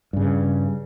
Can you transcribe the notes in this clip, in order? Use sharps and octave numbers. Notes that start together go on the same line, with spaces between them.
G2 C#3